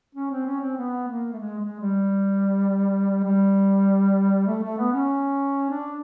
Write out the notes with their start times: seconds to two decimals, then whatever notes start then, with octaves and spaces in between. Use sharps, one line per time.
0.15 C#4
0.31 C4
0.46 C#4
0.61 C4
0.77 B3
1.08 A#3
1.33 A3
1.39 G#3
1.59 G#3
1.80 G3
3.24 G3
4.47 A3
4.63 A3
4.78 B3
4.93 C#4
5.70 D4